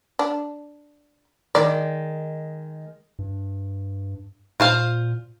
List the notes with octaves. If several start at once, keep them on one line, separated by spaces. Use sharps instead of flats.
D4
D#3 G#3 D5
G2
A#2 F4 C5 F5